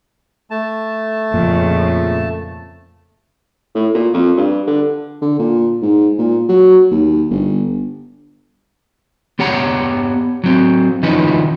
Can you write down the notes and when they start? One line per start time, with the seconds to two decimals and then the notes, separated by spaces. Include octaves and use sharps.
0.50 A3 A5
1.34 F2 A#2 C#3
3.75 A2
3.95 A#2
4.14 F2
4.37 G2
4.67 D3
5.22 D3
5.39 A#2
5.82 G#2
6.19 A#2
6.49 F#3
6.91 D#2
7.30 G1
9.39 B3 G4 C#5 F#5 A#5
10.44 F#3 C4
11.03 D#3 F3 C#4 D#4 B4